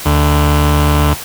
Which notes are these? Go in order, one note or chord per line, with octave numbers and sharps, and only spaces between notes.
D2